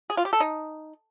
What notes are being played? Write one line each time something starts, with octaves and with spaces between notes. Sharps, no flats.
G#4
F4
G4
A4
D#4